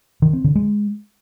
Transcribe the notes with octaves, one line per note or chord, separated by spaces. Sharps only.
D#3
C4
D3
G#3